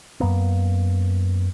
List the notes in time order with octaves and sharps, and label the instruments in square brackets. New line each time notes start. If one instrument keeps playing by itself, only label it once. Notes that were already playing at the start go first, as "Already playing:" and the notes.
[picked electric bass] F#2 A#3 B3